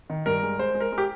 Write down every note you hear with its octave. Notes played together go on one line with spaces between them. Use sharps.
D#3
G2 A#4
G#3
G#3 C5
G#3
A#4
G#3
G4